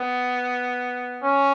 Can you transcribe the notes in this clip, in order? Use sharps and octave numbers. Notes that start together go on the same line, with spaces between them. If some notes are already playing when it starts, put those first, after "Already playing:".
Already playing: B3
C#4